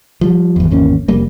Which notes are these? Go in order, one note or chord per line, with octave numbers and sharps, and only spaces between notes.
F3 G3
G#1 E2
G#1 E2 A#3 C#4
F1 G3 A#3